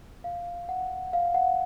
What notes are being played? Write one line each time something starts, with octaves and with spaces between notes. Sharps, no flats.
F5
F#5
F5
F#5